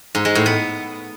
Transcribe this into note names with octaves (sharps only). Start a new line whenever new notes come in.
G#2
G#3
A2
B3